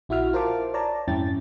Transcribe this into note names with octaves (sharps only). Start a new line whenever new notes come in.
A#1 E4 F#4 E5 F6
F4 A#4 C5 F5 A5 D6
C#5 D5 A5 A#5
F2 G#2 C#4 E4 G5 A6